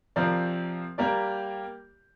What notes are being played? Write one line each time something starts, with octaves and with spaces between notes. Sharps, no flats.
C3 F3 C4 A#4 D5
G3 A#3 G4 A#4 D5